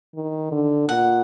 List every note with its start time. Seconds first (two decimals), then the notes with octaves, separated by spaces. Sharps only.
0.15 D#3
0.52 D3
0.88 A#2 F#5